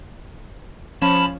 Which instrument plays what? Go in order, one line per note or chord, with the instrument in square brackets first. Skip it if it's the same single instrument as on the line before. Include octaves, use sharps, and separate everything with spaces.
[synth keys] F3 C#4 [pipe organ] A5 B5